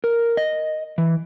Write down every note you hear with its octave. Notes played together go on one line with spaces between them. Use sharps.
A#4
D#5
E3